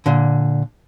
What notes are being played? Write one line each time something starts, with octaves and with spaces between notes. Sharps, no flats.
A#2 D3